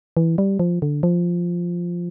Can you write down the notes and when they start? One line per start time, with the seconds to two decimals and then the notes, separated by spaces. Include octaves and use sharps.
0.17 E3
0.38 G3
0.59 F3
0.82 D3
1.03 F3